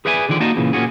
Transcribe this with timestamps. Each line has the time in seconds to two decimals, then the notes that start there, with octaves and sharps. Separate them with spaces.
0.05 G#4 B4 D5 E5 G#5
0.29 D3 D#3 F3 D5
0.40 A#3 D#4 F#4 D5 D#5 A5
0.57 A#2 C#3 E3
0.73 A#2 A#3 C#4 F#4 G#4